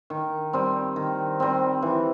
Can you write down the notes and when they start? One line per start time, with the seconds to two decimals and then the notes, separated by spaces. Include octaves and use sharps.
0.10 D#3
0.53 G3 C4
0.96 D#3
1.40 G3 C4
1.82 E3